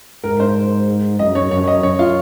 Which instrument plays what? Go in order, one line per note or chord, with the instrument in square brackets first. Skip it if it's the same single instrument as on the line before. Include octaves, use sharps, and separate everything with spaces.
[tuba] G#2 [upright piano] A#4
[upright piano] C5
[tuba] F#2 [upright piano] D#5
[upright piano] C#5
[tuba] F#2 [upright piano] C#5
[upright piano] D#5
[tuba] F#2 [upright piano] C#5
[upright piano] F4